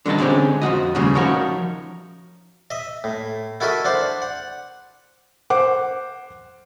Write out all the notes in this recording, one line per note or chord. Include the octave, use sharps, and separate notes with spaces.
D3 D#3 G3 D#5 A5
D3 G#3 C4 C#4 G4
F2 F3 F#4 D#5
D#2 A2 C#3 G3
F3 C#4 D#4 F#4 A#4 C#5
D#5 E5
A2
E4 F#4 A4 A#4 D#5 E5
D4 C5 F#5
F#5
C5 F#5 D6